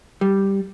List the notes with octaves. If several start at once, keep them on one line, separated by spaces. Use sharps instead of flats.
G3